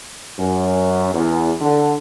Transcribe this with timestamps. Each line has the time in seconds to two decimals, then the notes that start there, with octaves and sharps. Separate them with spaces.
0.38 F#2
1.14 E2
1.61 D3